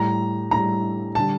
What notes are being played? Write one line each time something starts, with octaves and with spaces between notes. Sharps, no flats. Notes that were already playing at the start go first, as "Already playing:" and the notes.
Already playing: A2 G3 A#5
A2 G3 A#5
D3 G3 A5